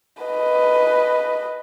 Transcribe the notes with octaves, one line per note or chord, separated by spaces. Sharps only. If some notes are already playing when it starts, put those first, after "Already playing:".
B4 D#5